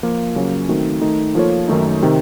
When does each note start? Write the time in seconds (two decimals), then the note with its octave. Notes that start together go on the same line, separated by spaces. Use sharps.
0.03 F3 A#3 F4
0.35 C#3 F#3 A#3 C#4
0.69 D#3 A3 C4 D#4 F#4
1.01 D#3 A3 D#4
1.35 F3 A#3 F4 A4 C#5
1.68 F#2 D#3 A3 D#4
2.02 C3 D#3